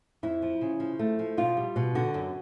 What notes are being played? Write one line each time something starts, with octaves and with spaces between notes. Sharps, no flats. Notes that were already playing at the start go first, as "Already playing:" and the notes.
F2 E4
F3
C#3
F3
A3
F3
B2 F4
G3
B2
D3 F#4
F#2